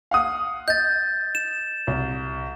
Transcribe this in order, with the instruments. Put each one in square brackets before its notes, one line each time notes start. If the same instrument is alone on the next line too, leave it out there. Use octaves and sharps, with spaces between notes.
[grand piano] F5 F#5 D#6
[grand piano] D#5 [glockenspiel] G6 A6
[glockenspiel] E7
[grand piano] C2